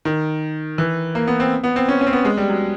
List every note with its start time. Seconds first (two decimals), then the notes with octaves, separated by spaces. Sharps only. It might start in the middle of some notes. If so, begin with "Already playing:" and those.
0.05 D#3
0.78 E3
1.15 A#3
1.27 B3
1.40 C4
1.64 B3
1.76 C4
1.88 C#4
2.01 C#4
2.07 C4
2.13 B3
2.25 G#3
2.37 G3
2.49 F#3